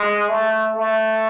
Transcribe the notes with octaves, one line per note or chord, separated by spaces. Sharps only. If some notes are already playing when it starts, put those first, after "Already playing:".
Already playing: G#3
A3
A3